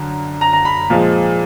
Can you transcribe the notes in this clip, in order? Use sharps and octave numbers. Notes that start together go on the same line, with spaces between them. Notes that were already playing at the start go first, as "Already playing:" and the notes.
Already playing: F#2 D3
A#5
A#5
B5
A#2 F3 G#3